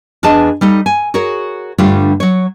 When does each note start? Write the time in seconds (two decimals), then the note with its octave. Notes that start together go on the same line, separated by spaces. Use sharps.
0.23 E2 D4 G#4 B4 D#5 A5
0.61 G3 D#4 A4
0.86 G#5
1.14 F#4 G#4 A#4 C#5
1.78 G2 D3 G3 A3 D4 F4
2.20 F#3 C#5